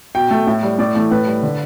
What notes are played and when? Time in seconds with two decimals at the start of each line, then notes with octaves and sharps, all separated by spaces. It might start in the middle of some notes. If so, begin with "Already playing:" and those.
0.15 B2 G5
0.31 A3
0.47 A2 E5
0.63 G3
0.79 A2 D5
0.95 E3 A3
1.11 A2 B4
1.27 G3
1.43 D3